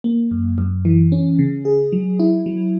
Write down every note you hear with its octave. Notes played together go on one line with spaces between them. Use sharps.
A#3
F#2
F#2
E3
C#4
C#3
G#4
F#3
E4
F#3